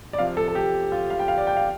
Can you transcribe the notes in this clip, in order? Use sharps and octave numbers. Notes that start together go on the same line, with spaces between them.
D5
C3 F3 F5
A4
A4
G4
F4
F5
G5
F5
D5
G5
F5